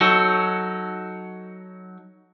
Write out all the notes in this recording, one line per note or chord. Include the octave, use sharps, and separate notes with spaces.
F#3 D#4 F#4 A4